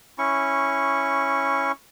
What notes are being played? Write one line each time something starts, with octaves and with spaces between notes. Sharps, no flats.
C#4 E4 C#6